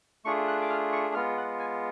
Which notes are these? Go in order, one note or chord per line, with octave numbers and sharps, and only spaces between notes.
A3 D4 F4 G#4 C#6
F#6
D6
F6
C#6
G#3 B3 F4 F6
F#5
G#5